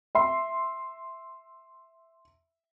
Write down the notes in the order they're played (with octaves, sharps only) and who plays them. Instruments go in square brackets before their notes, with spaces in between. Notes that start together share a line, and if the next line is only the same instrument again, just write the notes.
[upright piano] E5 C6